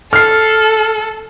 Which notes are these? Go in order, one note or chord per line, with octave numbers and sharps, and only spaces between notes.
A4 F6 C7